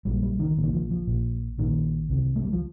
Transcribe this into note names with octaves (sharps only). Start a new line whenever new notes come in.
A#1 A#2 G3
G3
D#3
A#1 A#2
D#3
F3
F3
A#1 A#2
A#1 A#2 D#3
C2 C3
A3
G3
F3